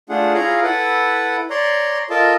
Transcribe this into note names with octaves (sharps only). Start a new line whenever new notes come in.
A3 D4 F4 G#4 F#5
E4 F4 G#4 C#5 F5 A#5
E4 A4 B4 F#5
C#5 D5 A#5 C6
F4 A4 A#4 D#5 A5